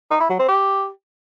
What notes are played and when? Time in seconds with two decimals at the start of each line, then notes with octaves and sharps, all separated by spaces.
0.11 D#4
0.20 E4
0.30 F#3
0.39 C4
0.48 G4